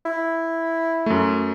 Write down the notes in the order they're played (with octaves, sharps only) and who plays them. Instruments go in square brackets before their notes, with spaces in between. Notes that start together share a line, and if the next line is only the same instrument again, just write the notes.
[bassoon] E4
[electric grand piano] F#2 A3